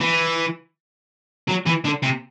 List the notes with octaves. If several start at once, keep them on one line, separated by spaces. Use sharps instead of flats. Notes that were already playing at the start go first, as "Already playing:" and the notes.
E3
F#3
E3
D3
C3